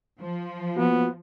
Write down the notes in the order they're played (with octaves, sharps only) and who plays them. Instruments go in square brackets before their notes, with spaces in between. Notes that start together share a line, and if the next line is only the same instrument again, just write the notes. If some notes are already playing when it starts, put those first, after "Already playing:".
[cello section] F3
[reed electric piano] A#3 F4 F#4 [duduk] B3